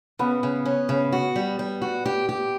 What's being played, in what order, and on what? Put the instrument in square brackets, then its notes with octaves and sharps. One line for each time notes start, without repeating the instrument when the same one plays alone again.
[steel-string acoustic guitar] C#3 [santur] B3
[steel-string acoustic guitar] C#3
C#4
C#3
F#4
G3
G3
F#4
G4
G4